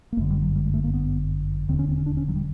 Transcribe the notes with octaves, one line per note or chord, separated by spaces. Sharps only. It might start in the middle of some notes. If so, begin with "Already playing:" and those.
A#3
G1 F#2 D3 A3
G3
F#3
G3
G#3
A3
A#3
B3
E1 D#2 D3 C4
C#4
C4
C#4
D4
C#4
F#3
G3